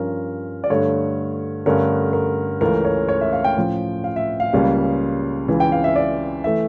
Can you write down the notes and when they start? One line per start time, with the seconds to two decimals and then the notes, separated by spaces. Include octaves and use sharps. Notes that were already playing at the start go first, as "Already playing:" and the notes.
Already playing: G2 F3 C#4 A#4
0.64 D5
0.70 G2 D3 A3 C#5
1.66 G2 D3 A3 C#4 A#4
2.13 A#4
2.61 C#2 C#3 E3 A3 A#4
2.85 C#5
3.09 C#5
3.21 E5
3.33 F5
3.44 G5
3.57 A2 F3 C#4
4.04 F5
4.16 E5
4.40 F5
4.53 C#2 C#3 G3 A#3 C#4
5.48 C#2 C#3 E3
5.60 G5
5.72 F5
5.84 E5
5.96 D5
6.44 E3 A3 E5